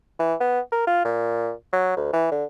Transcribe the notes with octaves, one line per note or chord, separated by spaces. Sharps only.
E3
B3
A#4
F4
A#2
F#3
D2
E3
D3